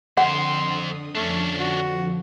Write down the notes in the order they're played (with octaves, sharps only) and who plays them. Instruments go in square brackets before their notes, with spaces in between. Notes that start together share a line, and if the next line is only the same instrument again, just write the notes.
[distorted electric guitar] F2 C4 [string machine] D3 D#6 [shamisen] F#5 [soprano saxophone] C6
[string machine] F2 D3 F3 [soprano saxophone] A3 [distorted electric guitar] C#4 D4
[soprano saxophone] F#4